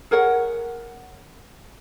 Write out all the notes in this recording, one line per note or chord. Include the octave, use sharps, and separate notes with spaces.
G#4 A#4 C#5 F#5